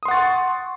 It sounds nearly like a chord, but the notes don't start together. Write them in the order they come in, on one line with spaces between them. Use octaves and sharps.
D#6 C6 F#5 A6 C#6